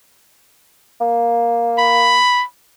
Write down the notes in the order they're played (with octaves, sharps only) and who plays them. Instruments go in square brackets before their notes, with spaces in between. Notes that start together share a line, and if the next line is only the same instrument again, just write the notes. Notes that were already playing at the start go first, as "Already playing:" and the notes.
[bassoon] A#3
[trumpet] B5